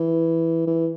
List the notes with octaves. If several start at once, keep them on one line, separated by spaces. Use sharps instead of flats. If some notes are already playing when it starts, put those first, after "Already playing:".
Already playing: E3
E3